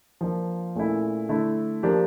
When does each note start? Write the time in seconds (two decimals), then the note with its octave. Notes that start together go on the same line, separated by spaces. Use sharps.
0.21 F3 A#3 D4 F4
0.75 A#2 A3 C#4 E4
1.29 D3 A3 E4
1.83 F3 A#3 D4 G4